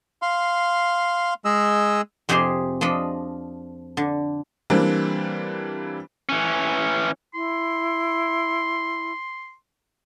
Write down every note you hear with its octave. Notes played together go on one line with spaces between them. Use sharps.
F5 C6
G#3 G#4 D#5 E6
F2 C3 G4 G#4 C5 C6
F3 D4 D#5 B5
D3
E3 G3 A#3 C4 D4
E3 C#4
E4 C6